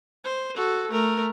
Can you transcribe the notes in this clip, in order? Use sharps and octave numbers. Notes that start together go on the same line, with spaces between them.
C5
F#4 A4
A3 A#4